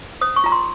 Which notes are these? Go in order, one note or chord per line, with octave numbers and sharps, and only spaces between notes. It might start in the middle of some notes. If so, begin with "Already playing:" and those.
C5 D#6
C#6
F4 A#5
C6